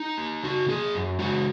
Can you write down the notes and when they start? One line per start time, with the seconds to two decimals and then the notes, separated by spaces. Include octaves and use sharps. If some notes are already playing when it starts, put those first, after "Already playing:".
Already playing: D#4
0.18 A#3
0.43 C#3 F#4
0.68 A#3 G#4
0.94 F#2
1.19 C#3 G#3 F#4